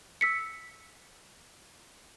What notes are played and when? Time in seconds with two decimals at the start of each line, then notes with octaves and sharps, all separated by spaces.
0.21 E6 B6 C#7